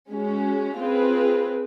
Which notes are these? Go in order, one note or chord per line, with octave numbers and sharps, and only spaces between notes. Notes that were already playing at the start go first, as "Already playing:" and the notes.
G#3 C#4 F#4
C4 F4 G#4 B4